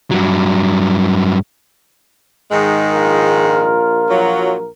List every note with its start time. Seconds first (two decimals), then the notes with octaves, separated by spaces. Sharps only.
0.11 G2 F#3
2.50 G#2 D#3 G#3
2.91 A#1 F4 A#4
4.09 F3 F#3